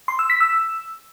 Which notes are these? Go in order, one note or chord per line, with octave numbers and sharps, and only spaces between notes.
C6
E6
B6
E6